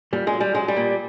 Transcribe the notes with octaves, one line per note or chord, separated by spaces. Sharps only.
A#2 G3
G#3
F#3
G3
F#3 G#3
G3
A#2